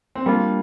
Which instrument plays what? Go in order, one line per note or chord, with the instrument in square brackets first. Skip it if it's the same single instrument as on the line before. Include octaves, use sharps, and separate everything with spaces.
[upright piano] C4
[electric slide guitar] G3 D4 F4 [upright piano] A#3